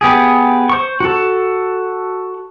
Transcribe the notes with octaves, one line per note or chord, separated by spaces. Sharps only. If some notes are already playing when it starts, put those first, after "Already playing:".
B3 G4 G#4
C5 C#6
F#4 A4